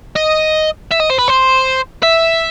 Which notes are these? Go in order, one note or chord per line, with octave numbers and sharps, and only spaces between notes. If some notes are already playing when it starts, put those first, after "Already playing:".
D#5
E5
D#5
C5
B4
C5
E5